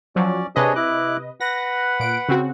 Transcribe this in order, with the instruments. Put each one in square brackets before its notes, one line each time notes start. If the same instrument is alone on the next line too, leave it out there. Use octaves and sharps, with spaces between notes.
[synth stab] F3 F#3 [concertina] C#4 D5
[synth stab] C3 B4 D#5 [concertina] D4 G#4 C#5
[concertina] E4 D6 F#6
[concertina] B4 F#5 [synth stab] A#6
[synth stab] A#2 D7
C#3 C4 F#4